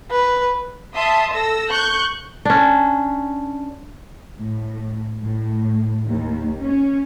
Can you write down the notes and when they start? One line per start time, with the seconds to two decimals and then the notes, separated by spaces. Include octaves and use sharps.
0.11 B4
0.95 E5 A5 C6 D#6
1.34 A4 E6 A#6
1.71 C#6 F#6 G6
2.45 C#4 D4
4.39 A2
5.21 A2
6.08 D#2
6.61 C#4